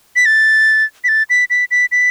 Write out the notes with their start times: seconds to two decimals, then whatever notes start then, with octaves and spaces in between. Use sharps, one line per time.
0.16 B6
0.26 A6
1.04 B6
1.08 A6
1.30 B6
1.50 B6
1.71 B6
1.92 B6